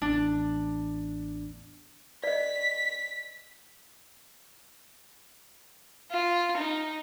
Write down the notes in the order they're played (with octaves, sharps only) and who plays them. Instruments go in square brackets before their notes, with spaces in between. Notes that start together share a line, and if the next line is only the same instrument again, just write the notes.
[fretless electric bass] A1 E2 [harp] D4
[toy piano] D5 D#5 [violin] B6
[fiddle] F4
D#4